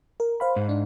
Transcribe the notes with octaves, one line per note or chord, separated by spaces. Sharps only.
A#4
C5 F5 B5
G#2
D4